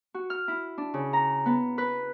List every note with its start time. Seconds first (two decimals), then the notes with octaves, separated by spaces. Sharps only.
0.14 F#4
0.30 F6
0.48 E4
0.78 D4
0.94 C#3
1.13 A#5
1.46 B3
1.78 B4